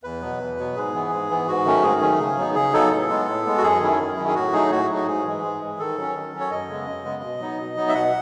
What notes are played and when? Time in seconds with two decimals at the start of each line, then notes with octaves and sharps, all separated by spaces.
0.03 E2 B4
0.21 B2 F#3 B3
0.40 E2
0.57 B2 F#3 B3
0.75 G#2 G#4
0.94 E3 B3
1.11 G#2
1.29 E3 B3
1.47 G#2 F#4
1.66 D#3 F#3 A3 C#4
1.83 G#2 G#4
2.01 D#3 F#3 A3 C#4
2.19 C#3
2.37 F#3 B3 D#4
2.55 C#3 G#4
2.73 F#3 B3 D#4 A4
2.91 A2
3.09 G#3 B3
3.27 A2
3.45 G#3 B3
3.57 F#4
3.63 F#2 G#4
3.81 D#3 F#3 C#4 E4
3.99 F#2
4.17 D#3 F#3 C#4 E4
4.28 G#4
4.35 A2 F#4
4.53 F#3 A3 D#4 G#4
4.71 A2 F#4
4.89 F#3 A3 D#4
4.95 F#4
5.07 G#2 G#4
5.25 E3 G#3
5.43 G#2
5.61 E3 G#3
5.79 D#3 A4
5.97 F#3 C#4
6.15 D#3
6.33 F#3 C#4
6.40 C#5
6.51 F#2 D#5
6.68 C#3 G#3 B3
6.87 F#2
7.05 C#3 G#3 B3
7.23 B2
7.40 F#3 B3 D#4
7.59 B2
7.76 F#3 B3 D#4
7.88 E5
7.94 B2 F#5